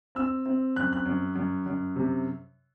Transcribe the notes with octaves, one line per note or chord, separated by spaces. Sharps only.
C4 E6
C4
F#2 F#6
F#6
F#2
F#2
F#2
C3